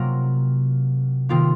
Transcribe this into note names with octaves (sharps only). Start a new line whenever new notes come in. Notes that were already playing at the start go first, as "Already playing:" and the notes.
Already playing: C3 F#3 A#3 F4 A#4
C3 D#3 A#3 F4